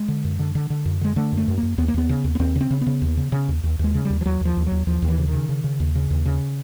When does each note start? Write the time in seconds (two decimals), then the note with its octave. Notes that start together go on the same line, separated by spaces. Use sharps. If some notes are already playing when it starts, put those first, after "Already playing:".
Already playing: G#3
0.08 D3
0.25 F#2
0.39 D3
0.55 D3
0.70 D3
0.85 F#2
1.01 D3 G#3
1.16 D3 A3
1.32 F#2 A3
1.48 F#2
1.58 A#3
1.63 F#2
1.78 D#2 B3
1.88 A#3
1.94 D#2 B3
2.09 C#3
2.24 D#2
2.35 B3
2.40 D#2 C4
2.55 C#3
2.61 C4
2.71 C#3
2.81 B3
2.87 C#3
3.02 D#2
3.17 C#3
3.32 C#3
3.48 D#2
3.63 D#2
3.79 D#2 G#3
3.94 C#3
4.05 G3
4.10 D#2
4.21 F3
4.26 D#2 F#3
4.41 D#2 F3
4.57 D#2
4.67 F#3
4.72 D#2
4.87 D#2 F3
5.02 D#2
5.08 E3
5.18 C#3
5.28 D#3
5.33 C#3
5.49 C#3
5.64 C#3
5.80 D#2
5.95 C#3
6.10 D#2
6.26 C#3